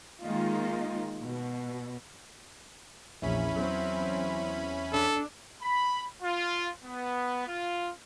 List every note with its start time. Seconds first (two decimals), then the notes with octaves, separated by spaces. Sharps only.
0.22 D#3 G#3 A#3 D#4 F4
1.21 B2
3.22 A#1 E2 C#4 E4 B5
3.55 F#3 C4
4.92 D4 A4
5.62 B5
6.23 F4
6.84 B3
7.47 F4